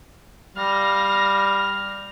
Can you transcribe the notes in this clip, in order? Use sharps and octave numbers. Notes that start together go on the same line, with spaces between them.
G3 F5 F6 A#6